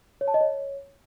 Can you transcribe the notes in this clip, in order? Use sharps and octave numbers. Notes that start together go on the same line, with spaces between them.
C#5
A5
D#5
C#5